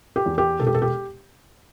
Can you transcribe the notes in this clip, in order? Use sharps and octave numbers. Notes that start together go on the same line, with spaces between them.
G4
E2
G4
E1 A4
G4
A4
G4